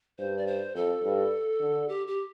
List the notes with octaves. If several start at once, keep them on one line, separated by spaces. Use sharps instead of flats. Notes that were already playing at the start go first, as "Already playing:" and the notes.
G2 C5
D5
C5
F2 A4
G2
D3
G4
G4